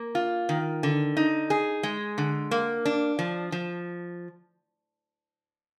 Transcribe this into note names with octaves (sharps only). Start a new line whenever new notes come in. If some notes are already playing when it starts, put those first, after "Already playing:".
Already playing: A#3
F4
D#3
D3
D#4
G#4
G#3
D3
A#3
D4
F3
F3